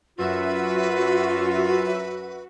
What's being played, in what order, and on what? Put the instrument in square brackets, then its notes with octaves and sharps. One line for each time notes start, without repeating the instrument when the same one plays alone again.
[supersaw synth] F#2 E5 [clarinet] F4 [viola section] F#4 [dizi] B4